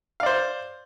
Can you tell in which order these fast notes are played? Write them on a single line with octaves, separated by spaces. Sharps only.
F5 D5 C5